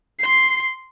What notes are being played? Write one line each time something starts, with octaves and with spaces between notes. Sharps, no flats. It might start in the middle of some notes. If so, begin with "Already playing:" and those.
C6 C7